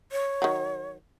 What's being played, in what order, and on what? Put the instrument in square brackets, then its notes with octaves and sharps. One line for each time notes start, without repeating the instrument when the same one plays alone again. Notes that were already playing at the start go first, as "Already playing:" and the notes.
[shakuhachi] C#5
[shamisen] D#3 F#3